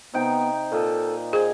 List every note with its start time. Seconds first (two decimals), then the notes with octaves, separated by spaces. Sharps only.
0.14 C3 B3 D#4 G5
0.72 A#2 A4 D#5
1.33 G#4 C5 D#5 G#5